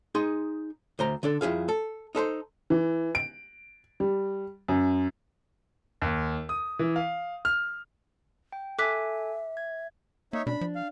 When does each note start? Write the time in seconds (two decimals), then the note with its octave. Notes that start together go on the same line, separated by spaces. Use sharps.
0.15 D#4 G#4 C6
0.99 D2 C5 A#5
1.23 D3 D4 A4
1.41 F2 E4 G#4 F5
1.69 A4
2.15 D#4 A4 B4 C5
2.70 E3
3.15 D7
4.00 G3
4.68 F#2
6.02 D#2
6.49 D#6
6.79 E3
6.96 F5
7.45 F6
8.52 G5
8.79 A4 E5 G#5 D6 F#6 B6
9.57 G#6
10.33 A#3 D#4 C#5 E5
10.47 B2 D4 B5
10.61 F3
10.75 F5